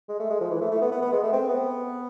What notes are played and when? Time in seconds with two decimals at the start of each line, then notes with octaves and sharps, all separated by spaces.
0.09 G#3
0.20 A3
0.30 G#3
0.40 F3
0.50 E3
0.61 A3
0.71 A3
0.81 B3
0.91 B3
1.02 B3
1.12 G#3
1.23 A3
1.33 C4
1.49 B3